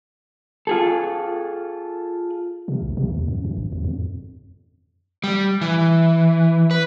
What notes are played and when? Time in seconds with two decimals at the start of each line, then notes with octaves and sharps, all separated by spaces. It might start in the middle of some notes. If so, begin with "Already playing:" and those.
0.67 F4 G#4 A4
2.68 C3
2.82 B1
2.97 C3
3.10 D#2
3.28 F#2
3.45 G2
3.57 G#1
3.72 E2
3.84 F2
5.24 G3
5.61 E3
6.71 B4